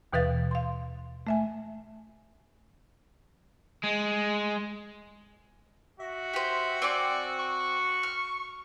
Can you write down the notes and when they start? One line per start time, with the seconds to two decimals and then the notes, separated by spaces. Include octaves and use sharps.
0.13 D#2 B2 E3 B4 F5 A6
0.51 F5 C6
1.27 A3 E5 G#5
3.83 G#3
6.00 F#4 E5
6.33 G4 C5
6.82 C4 D5 G#5 D6
7.39 C#6
8.03 F6